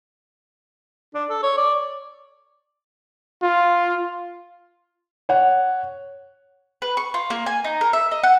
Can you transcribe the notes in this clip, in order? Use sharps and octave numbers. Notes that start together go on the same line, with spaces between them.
D4
A4
C#5
D5
F4
C#5 F#5
B4
C#6
F4
A#3
G#5
D#4
A#4
E5
D#5
F#5